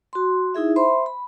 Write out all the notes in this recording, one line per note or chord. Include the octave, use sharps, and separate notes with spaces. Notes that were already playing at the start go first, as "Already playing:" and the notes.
F#4 C6
D#4 E4 G#4 E5
C5 E5 B5 C6
B5